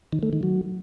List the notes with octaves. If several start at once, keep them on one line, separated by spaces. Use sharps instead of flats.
D#3
A3
D#3
F#3